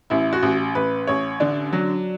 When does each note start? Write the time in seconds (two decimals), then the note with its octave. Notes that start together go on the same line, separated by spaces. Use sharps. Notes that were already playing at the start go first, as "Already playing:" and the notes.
0.10 A1 E4
0.33 F#4
0.43 A1
0.75 A1 B4
1.07 A1 C#5
1.40 D3 D4
1.73 F#3